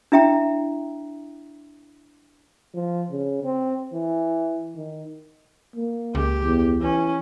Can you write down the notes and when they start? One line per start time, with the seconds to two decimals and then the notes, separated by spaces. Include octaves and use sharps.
0.12 D4 E4 E5 G5 A#5
2.74 F3
3.11 C#3
3.43 C4
3.93 E3
4.76 D#3
5.76 A#3
6.15 C#2 G4
6.44 E2
6.82 E3 C#4